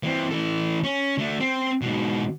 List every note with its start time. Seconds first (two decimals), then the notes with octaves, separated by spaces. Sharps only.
0.03 E3 C4
0.31 E3 A4
0.84 C#4
1.18 D3 A3
1.40 C4
1.82 G#2 B2